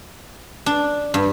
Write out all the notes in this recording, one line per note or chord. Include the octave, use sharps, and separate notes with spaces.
D4
G2